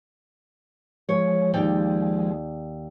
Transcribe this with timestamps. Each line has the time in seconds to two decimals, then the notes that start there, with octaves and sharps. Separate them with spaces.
1.09 F3 G#3 C#5
1.54 D#2 D5 G5